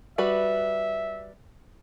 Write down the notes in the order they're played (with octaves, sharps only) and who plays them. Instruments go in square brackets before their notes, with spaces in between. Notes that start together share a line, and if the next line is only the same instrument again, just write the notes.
[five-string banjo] G3 F#4 B4 [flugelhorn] E5